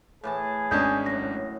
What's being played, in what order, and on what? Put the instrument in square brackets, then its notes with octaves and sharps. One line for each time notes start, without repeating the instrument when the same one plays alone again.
[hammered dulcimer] A2 E3 A5 [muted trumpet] G#4
[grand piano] G#1 C#4 D4 [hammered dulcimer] D#5 G#5 [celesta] G6
[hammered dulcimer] F#2 A2 [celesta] A#6